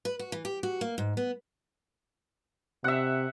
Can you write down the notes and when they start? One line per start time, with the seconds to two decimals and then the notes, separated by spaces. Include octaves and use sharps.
0.05 B4
0.19 F#4
0.32 E3
0.45 G4
0.63 F#4
0.81 A#3
0.98 G#2
1.17 B3
2.84 C3 E5 F#5